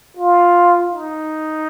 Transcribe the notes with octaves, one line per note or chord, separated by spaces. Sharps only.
F4
D#4